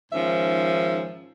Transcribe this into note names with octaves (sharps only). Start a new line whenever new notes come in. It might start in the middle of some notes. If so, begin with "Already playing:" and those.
G#2 D#3 F3 C#4 E5